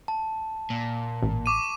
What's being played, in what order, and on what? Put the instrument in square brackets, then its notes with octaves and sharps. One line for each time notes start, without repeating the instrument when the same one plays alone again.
[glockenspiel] A5
[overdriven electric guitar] A#2
[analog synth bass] A1
[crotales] C#6 D6 D#7